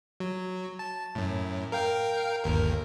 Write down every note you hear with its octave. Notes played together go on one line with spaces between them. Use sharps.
F#3
A5
F#2 A2
A#4 F5 G5
G1 D#2 A#4